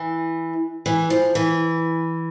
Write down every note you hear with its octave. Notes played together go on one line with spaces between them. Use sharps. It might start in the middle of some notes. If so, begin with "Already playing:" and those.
Already playing: E3
E3
F3
E3